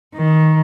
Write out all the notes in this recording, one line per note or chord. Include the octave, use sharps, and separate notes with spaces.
D#3